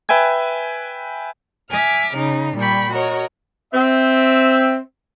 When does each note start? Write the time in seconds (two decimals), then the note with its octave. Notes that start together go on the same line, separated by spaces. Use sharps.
0.09 B4 E5 G5 G#5 G#6
1.70 E5 G#5 D6 F6
2.16 C#3 D#4
2.58 A#2 G3 G5 B5 C#6
2.92 F#4 A#4 C#5 D#5
3.73 C4 E5